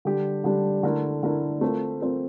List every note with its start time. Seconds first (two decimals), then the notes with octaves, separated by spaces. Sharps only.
0.05 D3 G3 D4 G4
0.44 D3 G3 D4 G4
0.83 D3 A3 E4 A#4
1.23 D3 A3 E4 A#4
1.61 A3 C4 F4 A#4
2.01 A3 C4 F4 A#4